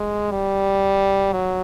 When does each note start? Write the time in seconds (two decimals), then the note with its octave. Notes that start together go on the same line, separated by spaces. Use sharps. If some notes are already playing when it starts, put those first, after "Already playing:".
Already playing: G#3
0.31 G3
1.32 F#3